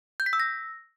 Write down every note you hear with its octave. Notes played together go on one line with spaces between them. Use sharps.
G6
B6
E6
A#6